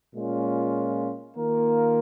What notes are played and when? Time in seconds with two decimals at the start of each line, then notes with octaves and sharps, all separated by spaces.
0.14 A#2 G#3 C#4 F4
1.35 D#3 A#3 F4 A#4